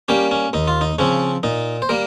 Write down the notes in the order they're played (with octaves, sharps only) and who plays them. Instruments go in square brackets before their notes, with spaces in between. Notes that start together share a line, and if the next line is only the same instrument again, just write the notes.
[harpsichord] G3 A#3 C#4 G4
C#4
D#2 D#4
F4
D#4
C#3 F3 C4 C#4
A#2 D#4
C5
G3 A#3 A#4